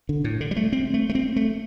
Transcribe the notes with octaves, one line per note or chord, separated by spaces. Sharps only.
D3
A2
D3
G3
A3
C4
A3
A3
C4
A3